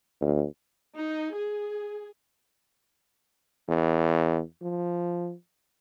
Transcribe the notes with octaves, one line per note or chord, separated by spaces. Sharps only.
D2
D#4
G#4
E2
F3